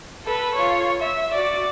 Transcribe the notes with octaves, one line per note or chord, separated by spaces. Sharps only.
A4 B4
F4 C#5
E5
F#4 D5